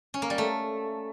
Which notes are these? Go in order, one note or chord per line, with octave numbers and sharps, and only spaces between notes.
C#4
A#3
G3
A3